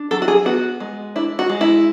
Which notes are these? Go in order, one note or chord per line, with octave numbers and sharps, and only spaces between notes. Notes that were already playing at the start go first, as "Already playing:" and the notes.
Already playing: D4
F#3 A4
F#4
G#4
B3 F#4
G#3
D4 E4
F#4
G#3
E4